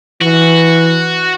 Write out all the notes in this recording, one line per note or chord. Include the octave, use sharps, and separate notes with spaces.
E3 F#4